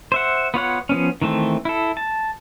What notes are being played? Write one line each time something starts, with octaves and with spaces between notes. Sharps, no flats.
C5 E5 F#5
B3 F4 C#5 F#5
F3 B3 C#4
D#3 E3 A3 C4
E4 A4
A5